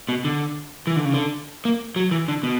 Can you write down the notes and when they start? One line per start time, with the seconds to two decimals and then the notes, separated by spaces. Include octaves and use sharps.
0.09 B2
0.25 D3
0.87 E3
0.96 D3
1.05 C#3
1.14 D3
1.65 A#3
1.96 F#3
2.11 E3
2.28 D3
2.43 B2